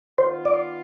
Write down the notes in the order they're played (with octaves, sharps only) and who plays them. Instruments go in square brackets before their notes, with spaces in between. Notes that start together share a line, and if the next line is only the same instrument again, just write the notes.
[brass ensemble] D#3 B3 F4 [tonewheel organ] C5
[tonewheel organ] D5